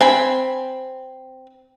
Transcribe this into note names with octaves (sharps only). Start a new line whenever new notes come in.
C4 G#5 B5